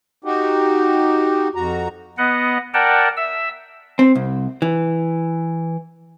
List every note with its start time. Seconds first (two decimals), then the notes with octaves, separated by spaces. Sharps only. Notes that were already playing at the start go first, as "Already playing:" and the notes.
0.25 D#4 F#4 G4
1.55 F2 F#4 A#5
2.18 B3 D#5 F#5
2.74 A#4 D5 F#5 G5 A5
3.17 E5 E6
3.99 C4
4.15 C2
4.62 E3